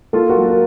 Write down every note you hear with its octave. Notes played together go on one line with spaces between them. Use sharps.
A#3 F4 A4
F#4 A#4
F#3
A#4